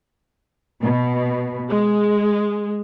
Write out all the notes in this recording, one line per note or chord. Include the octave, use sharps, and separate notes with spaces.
B2
G#3